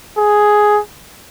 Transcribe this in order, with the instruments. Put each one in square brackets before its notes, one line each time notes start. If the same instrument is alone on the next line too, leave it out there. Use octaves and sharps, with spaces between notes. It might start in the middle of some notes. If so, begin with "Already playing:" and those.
[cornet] G#4